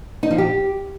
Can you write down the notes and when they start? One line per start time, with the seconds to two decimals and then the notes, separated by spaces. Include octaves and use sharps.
0.23 D#4
0.31 F3
0.38 G4